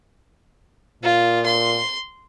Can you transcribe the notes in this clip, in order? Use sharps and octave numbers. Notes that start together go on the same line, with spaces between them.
A#2 F4
C6